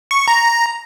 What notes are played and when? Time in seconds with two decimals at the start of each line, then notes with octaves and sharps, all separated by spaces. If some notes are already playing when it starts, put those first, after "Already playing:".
0.11 C#6
0.28 A#5